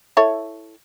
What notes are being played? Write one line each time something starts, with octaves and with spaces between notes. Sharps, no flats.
E4 A4 C#5